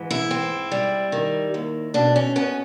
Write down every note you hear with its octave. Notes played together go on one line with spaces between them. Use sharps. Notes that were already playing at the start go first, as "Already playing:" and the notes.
Already playing: G#2 E3
E4
C4
G3
D#3
D#2
B2 D4
C#4
B3 C#4